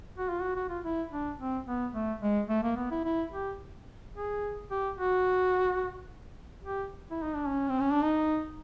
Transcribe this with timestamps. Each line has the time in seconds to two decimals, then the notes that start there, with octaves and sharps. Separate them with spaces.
0.18 F#4
0.29 F4
0.42 F#4
0.56 F#4
0.69 F4
0.84 E4
1.12 D4
1.39 C4
1.67 B3
1.94 A3
2.22 G#3
2.49 A3
2.63 A#3
2.77 B3
2.91 E4
3.05 E4
3.32 G4
4.15 G#4
4.71 G4
4.98 F#4
6.64 G4
7.11 E4
7.22 D#4
7.35 D4
7.46 C#4
7.69 C4
7.80 C#4
7.91 D4
8.02 D#4